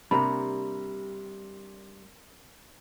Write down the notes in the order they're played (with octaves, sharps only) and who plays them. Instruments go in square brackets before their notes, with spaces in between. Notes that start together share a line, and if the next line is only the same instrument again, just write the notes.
[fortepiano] C3 A#3 [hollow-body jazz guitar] G3 D4 A#5 [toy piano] B5